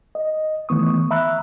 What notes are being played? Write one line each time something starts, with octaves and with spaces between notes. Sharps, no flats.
D#5
D#3 E3 A3 B3 C#6 D#6
E5 A#5 B5 E6 F#6